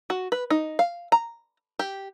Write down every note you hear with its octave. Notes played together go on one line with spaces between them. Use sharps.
F#4
B4
D#4
F5
A#5
G4